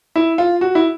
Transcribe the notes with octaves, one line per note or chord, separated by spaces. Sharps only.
E4
F4
F#4
E4